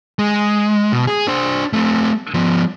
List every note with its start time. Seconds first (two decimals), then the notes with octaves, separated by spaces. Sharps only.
0.19 G#3
0.93 B2
1.07 G#4
1.28 D4 C5
1.73 A3 C4
2.34 F3 B3